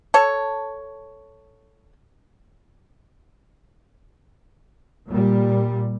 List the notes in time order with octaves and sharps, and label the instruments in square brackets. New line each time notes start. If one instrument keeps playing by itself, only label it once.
[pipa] A4 C#5
[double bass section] A#2 G3